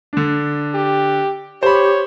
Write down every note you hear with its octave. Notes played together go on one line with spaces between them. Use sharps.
D3 D4
G4
G4 C5 C#5 B5